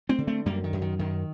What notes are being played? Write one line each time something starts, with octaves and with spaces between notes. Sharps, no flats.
A3 C4
D3
A3 C4
F#2 G3 A#3
D#3
F#2
D#3
F#2 D#3